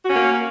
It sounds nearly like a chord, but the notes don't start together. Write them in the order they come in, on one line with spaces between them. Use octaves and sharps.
F#4 C#4 A#3